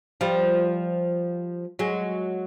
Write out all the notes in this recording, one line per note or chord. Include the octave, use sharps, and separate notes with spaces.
F3 G3
F#3 G#3